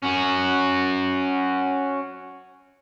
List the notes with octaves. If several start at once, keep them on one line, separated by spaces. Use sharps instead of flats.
C#4 F#4